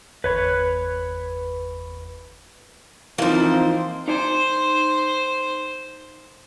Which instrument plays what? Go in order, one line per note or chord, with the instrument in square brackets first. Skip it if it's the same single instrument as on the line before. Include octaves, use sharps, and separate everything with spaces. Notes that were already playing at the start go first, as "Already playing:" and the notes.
[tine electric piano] G1 E2 B5 [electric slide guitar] B4 C#5
[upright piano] E3 F3 [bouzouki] A#3 C5 [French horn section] C4 D#4
[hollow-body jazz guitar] D#4 D5 G#5 [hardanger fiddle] C5